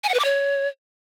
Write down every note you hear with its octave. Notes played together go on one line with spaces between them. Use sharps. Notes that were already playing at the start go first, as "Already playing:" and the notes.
G#5
F#5
B4
D6
C#5